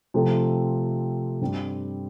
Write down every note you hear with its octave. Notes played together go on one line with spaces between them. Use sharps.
C3 F3 A3 C4 A4
G2 G3 C4